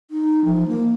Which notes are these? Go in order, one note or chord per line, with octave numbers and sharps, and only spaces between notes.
D#4
F3
A#3